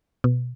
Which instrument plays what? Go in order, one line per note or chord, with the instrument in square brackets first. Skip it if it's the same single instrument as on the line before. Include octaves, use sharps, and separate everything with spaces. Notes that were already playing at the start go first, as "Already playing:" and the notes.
[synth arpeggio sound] B2